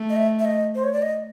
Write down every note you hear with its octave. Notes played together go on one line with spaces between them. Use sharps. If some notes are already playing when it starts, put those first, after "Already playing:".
Already playing: A3
D#5
E5
E5
D#5
C5
C#5
D5
D#5